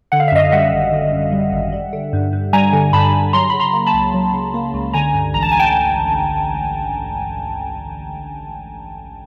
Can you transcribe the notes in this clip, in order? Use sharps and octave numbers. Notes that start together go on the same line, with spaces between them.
D3 F#5
F5
E5
F#2 D#5 F5
G3 E5 F#5
G#1
D3
F#2
G3
G#1
G3
D3
G2
G2
G3 G#5 A#5
D3
G2 A5 B5
G2
F#3 A#5 C6
C#3 B5
A#5 C6
A#3
A5 B5
C#2
F#3
C#3
A#3
C#2
D3 G#5 A#5
G2
A1 A#5
A5
G#5
G5 A5